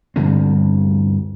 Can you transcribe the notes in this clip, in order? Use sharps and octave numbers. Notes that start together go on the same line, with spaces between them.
D2 G2 D3 C4